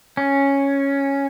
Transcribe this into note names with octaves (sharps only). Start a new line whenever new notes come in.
C#4